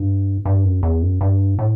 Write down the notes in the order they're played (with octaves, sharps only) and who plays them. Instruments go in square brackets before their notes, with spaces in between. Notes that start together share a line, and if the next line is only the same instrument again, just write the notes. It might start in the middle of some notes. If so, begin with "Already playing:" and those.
Already playing: [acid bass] G2
G2
F#2
E2
F#2
G2
A2